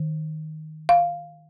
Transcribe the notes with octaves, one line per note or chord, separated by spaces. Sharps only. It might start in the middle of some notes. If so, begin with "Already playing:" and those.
Already playing: D#3
F5